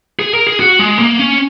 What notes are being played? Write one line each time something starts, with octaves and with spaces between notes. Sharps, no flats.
G#4
A#4
G#4
F#4
G#3
A#3
C#4